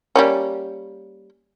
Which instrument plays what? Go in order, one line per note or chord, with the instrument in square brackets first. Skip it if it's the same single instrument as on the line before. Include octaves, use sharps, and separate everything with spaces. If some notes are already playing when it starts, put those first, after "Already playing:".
[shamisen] G3 A#3 C#4